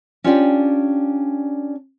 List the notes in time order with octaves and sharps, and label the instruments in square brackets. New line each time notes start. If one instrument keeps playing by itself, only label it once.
[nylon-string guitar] C#4 D4 F4 G4 D5 G5